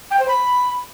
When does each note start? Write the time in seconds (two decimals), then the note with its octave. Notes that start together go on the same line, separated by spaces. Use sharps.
0.11 G5
0.20 C5
0.28 B5